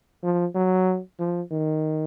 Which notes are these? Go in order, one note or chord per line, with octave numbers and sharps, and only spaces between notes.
F3
F#3
F3
D#3